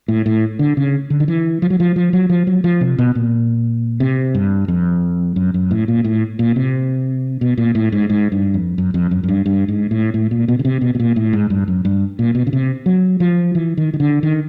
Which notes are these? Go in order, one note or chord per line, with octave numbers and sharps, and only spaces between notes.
A2
A2
D3
C#3
D3
D#3
E3
F3
F#3
F3
F3
F#3
F3
F#3
F3
C3
B2
A#2
C3
G2
F2
F#2
F#2
A2
A#2
A2
A#2
C3
B2
A#2
A2
G#2
G#2
G2
F2
F#2
F2
F#2
F#2
G2
G2
G#2
A2
A2
A#2
B2
C#3
C3
B2
B2
A#2
A2
G#2
G2
F#2
G2
A#2
B2
C#3
C3
F#3
F3
E3
D#3
D#3
D3
D#3